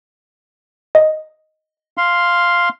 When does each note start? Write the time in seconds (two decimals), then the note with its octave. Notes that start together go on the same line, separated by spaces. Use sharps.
0.95 D#5
1.97 F5 C6